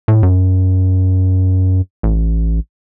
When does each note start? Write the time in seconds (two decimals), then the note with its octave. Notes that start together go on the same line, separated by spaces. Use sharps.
0.08 A2
0.23 F#2
2.03 A1